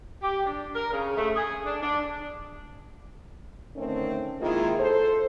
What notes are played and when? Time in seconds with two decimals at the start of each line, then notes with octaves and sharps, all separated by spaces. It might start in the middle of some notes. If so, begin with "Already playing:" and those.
0.22 G4
0.46 D4
0.76 A#4
0.93 C#3
1.17 A3
1.36 G#4
1.66 D4
1.83 D4
3.76 D3 D#3 A3 C4 C#4
4.41 D#3 G#3 A#3 E4 F4 G#4
4.79 A4 C5